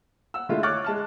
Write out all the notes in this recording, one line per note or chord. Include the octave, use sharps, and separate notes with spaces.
F#5 E6
D3 G#3 A3 E4 F4
C#5 C#6 D6 F6 F#6 A6
G#3 A5 F6